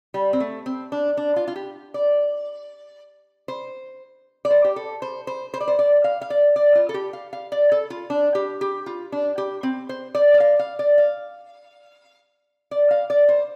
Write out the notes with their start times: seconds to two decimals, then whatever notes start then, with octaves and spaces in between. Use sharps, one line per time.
0.14 G3
0.33 C4
0.40 A3
0.66 C4
0.92 D4
1.17 D4
1.36 F4
1.48 F4
1.56 G4
1.94 D5
3.48 C5
4.45 D5
4.51 C5
4.64 G4
4.76 A4
5.02 C5
5.27 C5
5.54 C5
5.61 D5
5.68 C5
5.79 D5
6.04 F5
6.21 F5
6.30 D5
6.56 D5
6.75 F4
6.89 A4
6.94 G4
7.13 F5
7.33 F5
7.52 D5
7.72 A4
7.90 F4
8.10 D4
8.35 G4
8.61 G4
8.86 F4
9.12 D4
9.38 G4
9.63 C4
9.89 C5
10.15 D5
10.34 D5
10.40 F5
10.59 F5
10.79 D5
10.98 F5
12.71 D5
12.91 F5
13.10 D5
13.29 C5